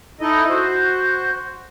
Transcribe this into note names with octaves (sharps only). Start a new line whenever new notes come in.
D#4 E4 A4 D#5
F#4 C5